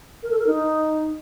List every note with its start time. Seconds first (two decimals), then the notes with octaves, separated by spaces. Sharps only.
0.23 A#4
0.31 A4
0.39 A#4
0.47 D#4